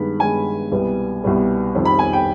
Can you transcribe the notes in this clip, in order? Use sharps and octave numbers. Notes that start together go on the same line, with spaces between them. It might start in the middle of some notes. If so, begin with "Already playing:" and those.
Already playing: G2 D#3 G#3 B3 B5
G2 D#3 G#3 B3 G#5
C2 B2 G3 B3
C2 B2 G3 B3
F1 F2 D#3 G3
B5
G#5
G5